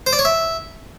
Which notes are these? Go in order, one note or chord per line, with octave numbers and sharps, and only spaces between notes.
C5
D5
C#5
E5